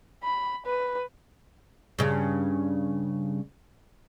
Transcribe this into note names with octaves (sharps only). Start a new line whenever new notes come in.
B5
B4
G2 C#3